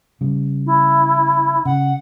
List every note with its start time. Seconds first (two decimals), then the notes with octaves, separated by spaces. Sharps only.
0.21 C#3 G3
0.66 E4
1.65 C#3 F#5